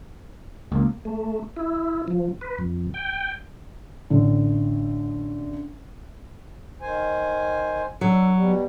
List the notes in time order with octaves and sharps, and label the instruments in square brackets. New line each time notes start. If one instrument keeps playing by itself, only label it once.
[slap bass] C#2 [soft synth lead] A#3
[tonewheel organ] A3
E4
F3
B4
F2
G5
[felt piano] A1 D3
[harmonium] D#3 C5 G#5
[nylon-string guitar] F#3 [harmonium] D4 A4
[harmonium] B2 G3